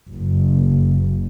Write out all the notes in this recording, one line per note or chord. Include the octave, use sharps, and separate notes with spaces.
F#1